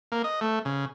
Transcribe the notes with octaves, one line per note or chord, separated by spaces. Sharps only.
A#3
D#5
A3
C#3